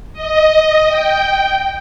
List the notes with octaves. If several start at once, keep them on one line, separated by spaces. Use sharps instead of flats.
D#5
G5